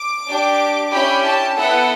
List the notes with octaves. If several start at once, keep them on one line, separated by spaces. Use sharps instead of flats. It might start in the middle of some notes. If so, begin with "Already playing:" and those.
Already playing: D6
D4 G4
C#4 E4 G4 B5
A5
B3 E4 A4 F#5